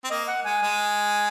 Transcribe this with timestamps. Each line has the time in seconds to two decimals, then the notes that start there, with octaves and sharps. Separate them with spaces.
0.04 C4
0.10 A#3 D#5
0.28 F#5
0.45 G#3 G#5
0.63 G#3